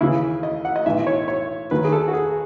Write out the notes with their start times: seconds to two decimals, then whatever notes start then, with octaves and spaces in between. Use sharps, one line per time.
0.01 D#2 C#3 E3 E4
0.43 D#5
0.65 F#5
0.76 D#5
0.86 B1 A2 E3 E5
1.07 C#5
1.28 C#5
1.71 D#2 D#3 F#3 B4
1.84 G#4
1.92 A4
2.08 F#4
2.13 G#4